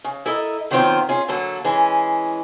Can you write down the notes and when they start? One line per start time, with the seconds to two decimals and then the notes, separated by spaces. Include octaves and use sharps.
0.04 C#3
0.26 E4 A4 A#4 D#5
0.71 A#2 D#3 F#3 B3 C4 F4
1.09 C#4 F4 G#4
1.28 D3 F#3 A#3 A4
1.65 E3 G#3 C#4 G#4